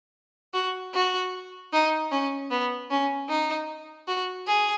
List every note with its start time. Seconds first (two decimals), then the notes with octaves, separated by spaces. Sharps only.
0.54 F#4
0.94 F#4
1.73 D#4
2.11 C#4
2.51 B3
2.90 C#4
3.29 D#4
4.08 F#4
4.47 G#4